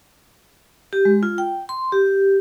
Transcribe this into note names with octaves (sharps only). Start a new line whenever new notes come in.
G4
G#3
F4
G5
C6
G4